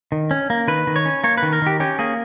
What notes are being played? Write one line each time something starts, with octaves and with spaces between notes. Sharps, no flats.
D#3
C#4
A#3
D#3 B4
D#3
C#5
C#4
A#3 C#5
D#3 B4
A#4
D#3 G4
C#4 G4
A#3 G#4